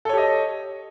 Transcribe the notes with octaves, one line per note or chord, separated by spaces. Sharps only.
G4 A4 C#5 D#5